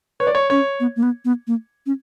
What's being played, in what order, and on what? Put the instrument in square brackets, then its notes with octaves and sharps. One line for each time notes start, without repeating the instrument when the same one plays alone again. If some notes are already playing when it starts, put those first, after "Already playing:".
[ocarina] B4 [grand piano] C#5
[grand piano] D5
C#5
[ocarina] C#4 [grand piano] C#5
[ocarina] B3
A#3
B3
B3
A#3
C#4